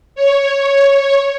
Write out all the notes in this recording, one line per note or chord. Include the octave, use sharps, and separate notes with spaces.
C#5